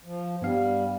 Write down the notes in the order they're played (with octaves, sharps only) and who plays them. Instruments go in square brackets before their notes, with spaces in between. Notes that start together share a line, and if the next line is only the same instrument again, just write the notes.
[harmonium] F3
[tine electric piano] G2 B3 F5 [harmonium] G3